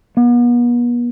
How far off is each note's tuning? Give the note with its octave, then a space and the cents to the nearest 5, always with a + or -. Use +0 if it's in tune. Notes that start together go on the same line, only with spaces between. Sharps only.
B3 -40